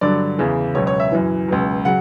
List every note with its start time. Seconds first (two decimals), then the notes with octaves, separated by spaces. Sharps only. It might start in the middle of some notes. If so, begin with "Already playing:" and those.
0.01 G2 D3 F#3 D5
0.38 E2 C#3 E3
0.75 C#2 B2 F#3 C#5
0.87 C#5
1.00 E5
1.12 F#2 E3
1.48 C#2 B2 F#3
1.85 C#3 F#3 F#5